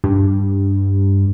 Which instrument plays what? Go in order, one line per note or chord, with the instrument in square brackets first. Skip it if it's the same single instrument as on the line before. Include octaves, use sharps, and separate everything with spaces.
[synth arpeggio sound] G2